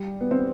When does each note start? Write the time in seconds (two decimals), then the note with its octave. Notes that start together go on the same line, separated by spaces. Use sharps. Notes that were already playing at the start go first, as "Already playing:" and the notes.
Already playing: G3
0.21 B3
0.31 C4